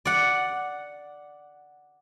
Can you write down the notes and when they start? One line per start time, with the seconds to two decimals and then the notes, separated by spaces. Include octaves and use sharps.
0.05 D5 F#5